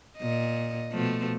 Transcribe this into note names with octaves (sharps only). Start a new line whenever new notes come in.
A#2 D#5
B2 F3 A3